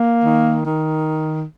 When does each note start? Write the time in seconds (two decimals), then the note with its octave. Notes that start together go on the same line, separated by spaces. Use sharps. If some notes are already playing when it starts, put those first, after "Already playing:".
Already playing: A#3
0.24 D#3
0.65 D#3